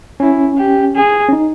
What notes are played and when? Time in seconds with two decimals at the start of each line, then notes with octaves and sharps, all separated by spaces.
0.20 C#4 E4
0.58 G4
0.96 G#4
1.29 C#4
1.33 D#4